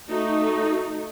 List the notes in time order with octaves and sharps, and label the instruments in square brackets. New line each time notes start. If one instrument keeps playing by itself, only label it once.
[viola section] A3 D#4 [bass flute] F#4